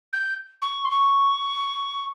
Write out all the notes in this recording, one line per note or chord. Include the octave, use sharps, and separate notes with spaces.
G6
C#6
C6
C#6